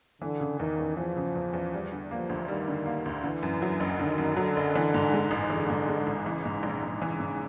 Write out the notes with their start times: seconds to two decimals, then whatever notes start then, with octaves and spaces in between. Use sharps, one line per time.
0.22 D3 E3
0.40 C#3
0.59 E2 D#3
0.79 E2
0.97 E3 F3
1.16 C#3
1.36 E2
1.53 E2
1.73 G3
1.92 D3
2.10 F3 A#3
2.29 D2
2.48 D#3 G3
2.68 D3
2.86 A#3
3.06 D2
3.24 D3 E3
3.43 F#2
3.62 F#3
3.80 F#1
3.99 D3 D#3
4.18 F#2
4.37 D3 F#3
4.57 F#1
4.75 E3
4.94 G#2
5.13 G#3
5.31 A1
5.50 D3 E3
5.70 G#2
5.89 G#3
6.07 A1
6.26 C#3 E3
6.45 G#2
6.63 A#1
6.83 A#1
7.02 C#3 E3
7.20 G#2